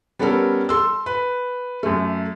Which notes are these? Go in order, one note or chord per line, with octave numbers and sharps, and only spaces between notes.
G3 B3 C#4 A4 A#4
A4 C6 E6
B4
F#2 A3